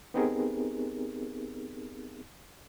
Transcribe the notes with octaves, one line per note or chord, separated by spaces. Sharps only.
B3 C4 D#4 G4 G#4 A#4